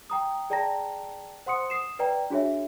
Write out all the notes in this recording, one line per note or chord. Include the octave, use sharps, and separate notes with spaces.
G5 A#5 D#6
G#4 D5 G5 A5 A#5 A#6
C5 F#5 C6 D#6 C#7
D#6 C7 E7
B4 D5 G5 A#5
D4 F#4 G#4 C#5 E5